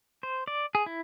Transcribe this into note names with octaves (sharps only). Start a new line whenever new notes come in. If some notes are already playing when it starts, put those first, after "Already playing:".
C5
D5
G#4
E4